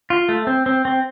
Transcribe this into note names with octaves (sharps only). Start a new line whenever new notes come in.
F4
A3
C4
C4
C4